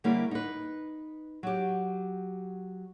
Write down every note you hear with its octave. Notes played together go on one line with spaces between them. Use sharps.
D3 G3 A#3 C#4 E4 G#4
D#4 B4
F#3 G4